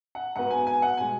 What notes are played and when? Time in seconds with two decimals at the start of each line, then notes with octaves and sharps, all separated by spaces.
0.15 F#5
0.36 G#2 F#3 B3 F#5
0.51 G#5
0.67 G#5
0.82 F#5
0.97 B2 G#3 G#5